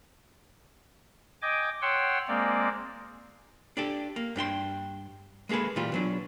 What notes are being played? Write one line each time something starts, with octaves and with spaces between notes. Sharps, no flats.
D#5 G5 G#5 D6
C#5 F#5 G5 C6 E6
G#3 A#3 C4 D5
D4 G4 A4
A#3
G2 D4 G5 C6
G#3 A#3 G#4 A4 B4
A#2 E3 G3 F4
B2 F#3 D4